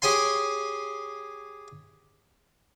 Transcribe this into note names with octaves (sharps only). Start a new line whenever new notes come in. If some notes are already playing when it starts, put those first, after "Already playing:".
G4 G#4 C#5 G#5 C6